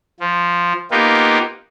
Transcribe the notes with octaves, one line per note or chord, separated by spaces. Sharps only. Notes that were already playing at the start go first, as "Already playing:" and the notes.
F3
A#3 B3 D#4 F4 G4